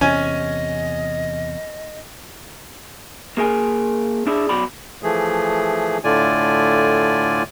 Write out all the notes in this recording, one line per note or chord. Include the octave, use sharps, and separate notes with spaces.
E2 C3 C#4 D#5 G#5
A#3 G#4 A#4 G#5
D4 E4 G#4 D5
B2 F#3 D5 B5
E3 F3 A3 G#4
A2 D3 A3 F4 D5 G#5